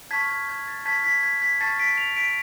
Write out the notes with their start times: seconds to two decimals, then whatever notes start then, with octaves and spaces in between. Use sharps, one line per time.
0.11 A5 C#6 F6 G#6 B6
0.30 G#6
0.49 G#6
0.68 A6
0.85 A5 C#6 F6 G#6 B6
1.04 G#6 B6
1.23 G#6 B6
1.42 G#6 B6
1.61 A5 C#6 F6 A6 C#7
1.80 B6 D7
1.97 C#7 F7
2.16 B6 D7